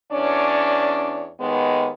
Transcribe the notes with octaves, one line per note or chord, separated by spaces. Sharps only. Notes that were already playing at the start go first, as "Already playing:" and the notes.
E2 C#4 D4 C#5 D5
D#2 D#3 G#3 B3